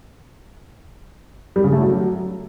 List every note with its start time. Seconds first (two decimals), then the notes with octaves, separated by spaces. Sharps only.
1.56 G3
1.64 C#3
1.72 A3
1.80 F#3